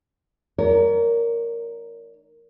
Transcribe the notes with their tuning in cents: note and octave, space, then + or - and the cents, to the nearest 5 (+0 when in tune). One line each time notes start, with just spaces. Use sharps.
D#4 -20 A#4 +0 C#5 +45